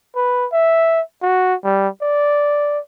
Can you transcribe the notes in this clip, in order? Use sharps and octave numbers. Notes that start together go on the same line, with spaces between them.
B4
E5
F#4
G3
D5